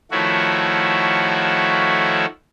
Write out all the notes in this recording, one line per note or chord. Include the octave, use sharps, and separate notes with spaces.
D#3 F3 A3 E4 F#4 C#5